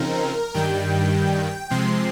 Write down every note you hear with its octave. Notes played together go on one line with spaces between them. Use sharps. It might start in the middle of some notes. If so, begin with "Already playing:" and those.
Already playing: C#3 F3 C4 D#4 A#4
G2 D#3 G3 G5
C3 F3 G#3 C4 C6